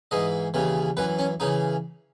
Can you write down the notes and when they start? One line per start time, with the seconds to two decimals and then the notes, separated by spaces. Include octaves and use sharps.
0.11 G#2 E3 D#5
0.54 D#2 C#3 E3
0.97 F#2 E3 B4
1.19 C#4
1.40 C#3 E3 D#4